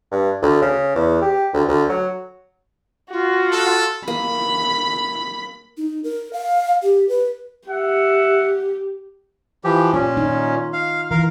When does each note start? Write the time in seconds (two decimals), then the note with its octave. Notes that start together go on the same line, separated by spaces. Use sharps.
0.11 G2
0.42 D2
0.62 C#3
0.95 E2
1.22 G4
1.54 D2
1.69 D2
1.90 F#3
3.12 F4 F#4
3.52 A4
4.08 A#3 B5
5.78 D#4
6.04 A#4
6.33 F5
6.83 G4
7.09 B4
7.69 G4 E5 F#5
9.64 E3 F3 G4
9.94 A#2 C#4 F4
10.17 D#4
10.73 F5
11.11 E3 A#4 F5